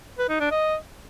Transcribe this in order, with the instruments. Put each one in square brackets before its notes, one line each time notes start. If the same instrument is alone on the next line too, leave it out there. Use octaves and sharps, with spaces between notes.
[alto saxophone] B4
D#4
D4
D#5